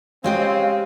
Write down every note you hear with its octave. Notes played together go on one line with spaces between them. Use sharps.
C#3 G#3 C4 G4 D#5 F5